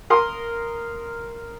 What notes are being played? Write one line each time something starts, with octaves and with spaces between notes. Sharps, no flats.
A#4 C6 D#6